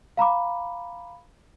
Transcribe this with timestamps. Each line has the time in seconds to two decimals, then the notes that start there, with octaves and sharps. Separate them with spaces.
0.17 F5 A#5 B5 D6